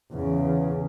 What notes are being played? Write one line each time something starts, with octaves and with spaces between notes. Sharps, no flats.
E2 C#3